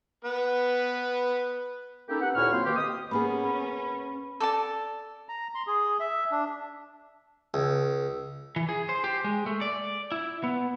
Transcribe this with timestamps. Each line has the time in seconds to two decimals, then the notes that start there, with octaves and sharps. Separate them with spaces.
0.25 B3 B4
2.09 A#3 C#4 D#4 E4 G4 A4
2.21 B3 C#4 G4 F#5
2.35 D2 A#2 E4 C#5 F6
2.51 F#3 A#3 C4 C5 F5
2.65 B2 D#3 A#3 G4
2.76 D#6
3.11 A#3 B3 C#4 G#4 B5
4.40 A4 D5 A5
5.29 A#5
5.55 C6
5.67 G#4
6.00 E5
6.32 D4
7.54 C#2
8.56 E3
8.69 G#4
8.89 C5
9.04 G4
9.24 G#3
9.46 A3
9.61 D5
10.12 E4
10.44 B3